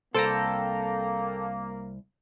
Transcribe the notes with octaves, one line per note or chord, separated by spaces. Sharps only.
C2 A#3 A4 C5 G5 A#5